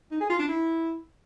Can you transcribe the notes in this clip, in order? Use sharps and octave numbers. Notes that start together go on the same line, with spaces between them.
D#4
G#4
F4
D4
E4